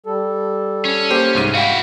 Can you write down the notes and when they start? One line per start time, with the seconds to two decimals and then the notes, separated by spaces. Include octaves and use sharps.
0.06 G3 A4
0.85 C#4
1.11 A#3 G4 C5
1.35 C2 G#2 D#7
1.55 E4 F#4 F5 G5